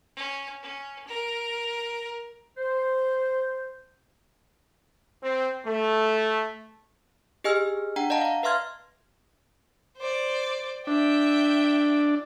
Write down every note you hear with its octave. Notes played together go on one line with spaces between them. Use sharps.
C#4
C#4
A#4
C5
C4
A3
G4 G#4 D#5 G#5 E6 F6
D4 F#5 G5 A#5
D5 D#5 F5 F#5 A5 A#5
F5 A#5
B4 E5 F5 C6 F6 G#6
C5 D5
D4 E5 G5